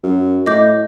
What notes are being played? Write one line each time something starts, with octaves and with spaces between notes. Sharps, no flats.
F#2
A2 D#5 D6 G6